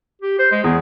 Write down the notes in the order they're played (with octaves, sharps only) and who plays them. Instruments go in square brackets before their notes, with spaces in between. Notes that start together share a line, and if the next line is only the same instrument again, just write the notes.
[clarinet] G4
C5
G#3
[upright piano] E2 [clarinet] G#4